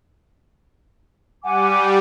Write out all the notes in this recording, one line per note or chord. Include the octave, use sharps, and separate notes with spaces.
G3 F#5 G#5 D6